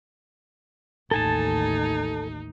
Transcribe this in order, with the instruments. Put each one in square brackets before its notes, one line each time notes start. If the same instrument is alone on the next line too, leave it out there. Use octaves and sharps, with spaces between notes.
[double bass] A1 D#2 [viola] D#4 [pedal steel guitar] A4 G#5 A5